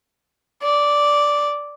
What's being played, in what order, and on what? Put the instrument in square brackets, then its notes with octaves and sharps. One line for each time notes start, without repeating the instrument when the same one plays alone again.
[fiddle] D5